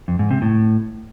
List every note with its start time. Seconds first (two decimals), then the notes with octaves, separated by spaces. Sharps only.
0.08 F2
0.19 G#2
0.31 C3
0.42 A2